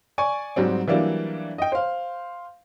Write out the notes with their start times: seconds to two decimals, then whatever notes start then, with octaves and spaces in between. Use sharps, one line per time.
0.18 D5 G#5 C#6
0.56 G#2 F#3 G3 C4
0.87 E3 F#3 G3 A#3 D4 E4
1.58 D#5 G5
1.72 C5 F5